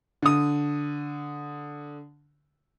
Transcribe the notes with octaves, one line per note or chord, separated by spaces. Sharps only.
D3 D#6